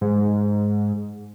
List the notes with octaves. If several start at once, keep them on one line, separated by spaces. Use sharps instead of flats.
G#2